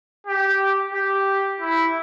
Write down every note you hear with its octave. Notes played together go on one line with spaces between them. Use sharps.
G4
G4
E4